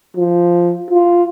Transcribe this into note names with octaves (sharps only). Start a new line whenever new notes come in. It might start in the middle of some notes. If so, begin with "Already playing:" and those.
F3
F4